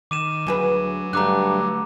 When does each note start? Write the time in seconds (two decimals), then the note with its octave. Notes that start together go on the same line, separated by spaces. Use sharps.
0.11 D#3 D6 D#7 E7
0.47 D2 F#3 G#4 B4
1.13 G2 D3 A3 A#5 D6 F#6